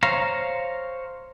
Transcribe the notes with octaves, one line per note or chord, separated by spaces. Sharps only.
C5 C#5 F5 A#5